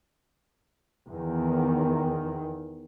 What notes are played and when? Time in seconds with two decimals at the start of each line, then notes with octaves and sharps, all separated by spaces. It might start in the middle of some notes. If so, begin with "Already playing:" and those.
1.09 E2 D#3